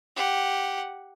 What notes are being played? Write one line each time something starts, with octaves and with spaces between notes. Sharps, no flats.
G4 F#5